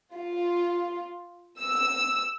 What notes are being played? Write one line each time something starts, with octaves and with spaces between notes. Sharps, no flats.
F4
E6